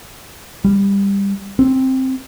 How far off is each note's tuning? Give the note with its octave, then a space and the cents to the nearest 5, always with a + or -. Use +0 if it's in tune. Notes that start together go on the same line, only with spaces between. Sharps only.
G3 +20
C4 +5